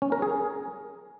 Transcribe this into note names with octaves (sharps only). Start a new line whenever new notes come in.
C#4
A#4
G#4